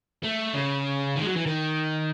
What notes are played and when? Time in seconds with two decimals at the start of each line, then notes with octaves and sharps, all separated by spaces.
0.24 A3
0.54 C#3
1.16 D#3
1.21 G#3
1.25 F#3
1.36 E3
1.46 D#3